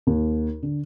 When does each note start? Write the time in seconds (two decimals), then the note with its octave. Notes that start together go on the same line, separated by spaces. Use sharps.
0.07 D#2
0.63 D3